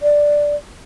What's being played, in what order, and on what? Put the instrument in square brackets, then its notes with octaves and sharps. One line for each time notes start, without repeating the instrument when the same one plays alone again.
[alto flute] D5